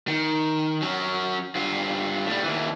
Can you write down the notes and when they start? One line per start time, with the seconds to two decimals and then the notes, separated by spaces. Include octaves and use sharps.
0.08 D#3
0.82 F#3 C#4
1.55 G2 F4
2.26 A2 G3
2.44 D#2 E3